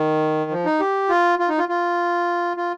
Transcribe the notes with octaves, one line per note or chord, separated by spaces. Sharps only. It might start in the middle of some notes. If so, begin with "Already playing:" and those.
Already playing: D#3
F3
D#4
G4
F4
F4
D#4
F4
F4
F4